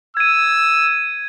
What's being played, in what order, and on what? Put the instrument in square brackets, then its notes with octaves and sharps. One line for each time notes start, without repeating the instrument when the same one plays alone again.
[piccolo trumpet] E6 [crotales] G#6 D#7